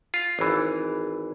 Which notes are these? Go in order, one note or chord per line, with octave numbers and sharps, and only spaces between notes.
F4
G#1 E3